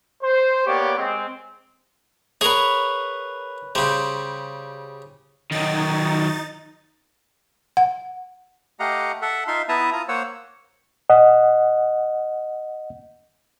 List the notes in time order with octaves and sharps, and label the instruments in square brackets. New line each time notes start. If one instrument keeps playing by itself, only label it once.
[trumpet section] C5
A#3 B3 G4 C#5 D5
G#3 C4
[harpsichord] G#4 A#4 [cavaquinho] B4 C#5
[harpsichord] C#3 G3 [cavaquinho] C5
[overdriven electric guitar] D#3 F#3 [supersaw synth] D#4 A6
[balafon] F#5
[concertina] A3 G4 D#5 F5 F#5 A#5
A4 E5 F#5
D#4 F4 E5 F5 C6
B3 E4 E5 A5 A#5 D#6
F4 A#5 D#6
A#3 C5 C#5 F#5 E6
[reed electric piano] D#5 F#5